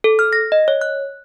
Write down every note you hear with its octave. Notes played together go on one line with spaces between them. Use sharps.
A4
F6
A#6
D#5
C#5
F#6